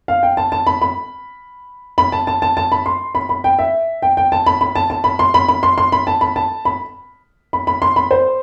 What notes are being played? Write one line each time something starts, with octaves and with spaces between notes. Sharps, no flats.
F5
G5
A5
A5
B5
B5
B5
A5
A5
A5
A5
B5
C6
B5
B5
G5
E5
G5
G5
A5
B5
B5
A5
A5
B5
C6
B5
B5
C6
C6
B5
A5
B5
A5
B5
B5
B5
C6
B5
C5